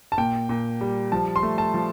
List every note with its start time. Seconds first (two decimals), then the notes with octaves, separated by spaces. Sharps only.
0.12 A5
0.18 A#2 G5
0.49 A#2
0.81 G3
1.12 F3 A5
1.36 C6
1.43 A3
1.58 A5
1.74 F3